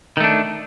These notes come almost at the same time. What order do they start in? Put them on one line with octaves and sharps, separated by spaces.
D#3 A3 D4